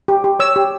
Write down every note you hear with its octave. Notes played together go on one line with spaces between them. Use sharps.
G4
G4
C#5 E6
G4